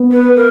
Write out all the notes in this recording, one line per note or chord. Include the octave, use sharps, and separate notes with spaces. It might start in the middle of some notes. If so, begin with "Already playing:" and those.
Already playing: B3
B4
A#4